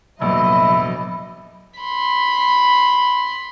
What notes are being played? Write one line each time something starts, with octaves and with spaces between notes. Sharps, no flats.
F1 A#1 E2 F#3 D#5 E5 B5
B5 C6